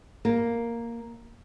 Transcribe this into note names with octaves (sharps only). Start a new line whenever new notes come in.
A#3